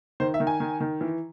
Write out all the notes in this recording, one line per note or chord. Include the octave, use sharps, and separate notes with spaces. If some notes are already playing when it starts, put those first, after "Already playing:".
D#3 C5
E5
D#3
G#5
D#3
D#3
E3